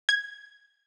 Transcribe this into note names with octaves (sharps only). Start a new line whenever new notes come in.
G#6